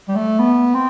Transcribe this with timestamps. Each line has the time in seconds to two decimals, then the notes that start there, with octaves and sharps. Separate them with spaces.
0.09 G3
0.16 A3
0.39 B3
0.75 C4